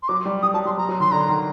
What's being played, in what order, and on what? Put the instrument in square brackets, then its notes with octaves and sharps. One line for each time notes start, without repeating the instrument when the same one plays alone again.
[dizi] C6
[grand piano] F#3 [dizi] D6
[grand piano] G3
[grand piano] G3 [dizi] D#6
[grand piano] F#3 [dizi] A5
[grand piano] G3 [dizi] C6
[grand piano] F#3 [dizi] A#5
[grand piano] F#3
[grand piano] D#3 [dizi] C6
[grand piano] D3 [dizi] A#5
[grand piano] D#3